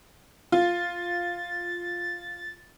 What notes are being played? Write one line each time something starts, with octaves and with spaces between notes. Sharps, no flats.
F4 A6